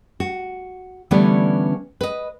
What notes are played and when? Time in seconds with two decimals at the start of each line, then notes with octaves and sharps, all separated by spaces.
0.20 F#4
1.11 D3 E3 G3 A3 B3 C#4
2.01 B4 D#5